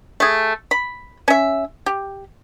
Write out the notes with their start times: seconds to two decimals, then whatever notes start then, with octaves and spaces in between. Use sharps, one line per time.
0.20 A3 G#4
0.71 B5
1.28 C#4 E5
1.86 G4